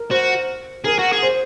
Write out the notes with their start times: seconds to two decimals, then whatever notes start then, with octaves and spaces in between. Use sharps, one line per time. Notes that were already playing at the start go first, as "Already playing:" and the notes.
Already playing: A#4
0.11 F#4 C5
0.84 G#4 A#4
0.99 F#4
1.13 G#4
1.23 C5